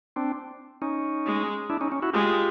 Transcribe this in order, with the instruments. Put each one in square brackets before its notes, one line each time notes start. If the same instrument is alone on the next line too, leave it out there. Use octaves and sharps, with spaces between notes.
[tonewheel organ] C4 D4
C#4 D#4
[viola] G#3
[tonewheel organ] D4 E4
C#4 D#4
C#4
E4 F#4
[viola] G#3 [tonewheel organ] F4 G4